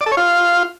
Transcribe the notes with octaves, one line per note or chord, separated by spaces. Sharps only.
D5
A4
C#5
F4